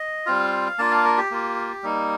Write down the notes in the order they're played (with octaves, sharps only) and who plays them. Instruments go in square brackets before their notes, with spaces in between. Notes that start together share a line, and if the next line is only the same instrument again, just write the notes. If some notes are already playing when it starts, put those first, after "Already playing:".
Already playing: [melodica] D#5
G3 C4 F4 F5
A#3 D4 F4 A5
F5
A#4
G4
A#3 F4
G3 A#3 D#4